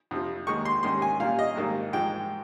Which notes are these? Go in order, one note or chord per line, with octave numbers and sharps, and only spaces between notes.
F2 C3 F3
D#2 D#3 G#3 D#4 C#6
C6
G#2 D#3 G3 C#4 C6
G#5
A#2 G3 C#4 F5
D#5
G#1 G#2 D#3 G3 A#3
G#2 F3 G#3 G5